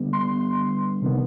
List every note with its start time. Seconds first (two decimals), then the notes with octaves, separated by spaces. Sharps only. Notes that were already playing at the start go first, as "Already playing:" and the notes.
Already playing: D3 G3 B3
0.13 C6
1.02 C3 D#3 B3